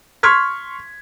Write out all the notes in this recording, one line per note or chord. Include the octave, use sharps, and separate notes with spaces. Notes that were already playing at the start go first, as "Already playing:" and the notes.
C6 C#6 F6 G#6 B6